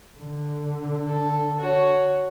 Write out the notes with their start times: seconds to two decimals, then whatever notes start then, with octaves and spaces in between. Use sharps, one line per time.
0.19 D3
1.07 A4
1.60 F#4 C#5